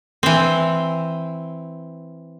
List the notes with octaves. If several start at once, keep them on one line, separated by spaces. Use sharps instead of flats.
E3 C4